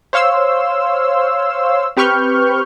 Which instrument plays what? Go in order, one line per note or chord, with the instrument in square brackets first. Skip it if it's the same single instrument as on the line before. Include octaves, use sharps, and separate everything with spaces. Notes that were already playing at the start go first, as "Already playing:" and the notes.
[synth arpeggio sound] C5 C#5 F5 C6 E6
C4 G4 B4 C#6 F6 G6